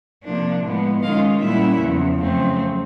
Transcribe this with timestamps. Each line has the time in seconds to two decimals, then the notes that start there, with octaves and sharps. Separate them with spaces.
0.24 C3 F3 A#3 D4
0.63 A2 F3 G#3 B3
1.02 D#3 G#3 C#4 F4 D#5 F5
1.41 A#2 G3 A#3 C#4 E4 E5 F#5
1.80 E2 C#3 F3
2.19 F2 C#3 F#3 A3 C4